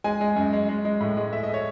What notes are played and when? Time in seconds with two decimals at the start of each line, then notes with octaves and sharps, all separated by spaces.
0.04 G#3 G#5
0.21 G#3
0.36 F#2
0.53 G#3
0.69 G#3
0.85 G#3
1.01 A2
1.17 G#3
1.32 A3 E5
1.43 D#5
1.49 A3
1.54 C#5